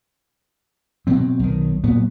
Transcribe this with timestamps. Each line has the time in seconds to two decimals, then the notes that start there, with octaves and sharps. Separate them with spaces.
1.07 B2 F#3 C4
1.39 B1 D#3
1.84 A#2 F#3 B3